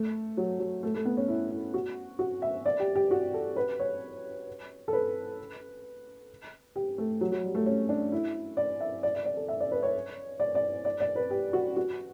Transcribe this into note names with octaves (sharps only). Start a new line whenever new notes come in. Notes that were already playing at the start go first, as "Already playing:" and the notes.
Already playing: A3
F#3
F#3
A3
A3
B3
C#4
E4
E4
F#4
F#4
E5
D5
G4
G4
F#4
A4
B4
C#5
A4
B4
G4
A3
F#3
F#3
G3
A3
C#4
D4
E4
D5
E5
D5
D5
D5
A4
E5
D5
B4
C#5
D5
D5
D5
D5
B4
G4
F#4
F#4